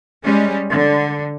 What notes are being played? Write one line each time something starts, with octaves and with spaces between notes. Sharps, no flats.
G3 G#3 C#4
D3